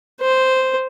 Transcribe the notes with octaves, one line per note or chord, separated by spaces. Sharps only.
C5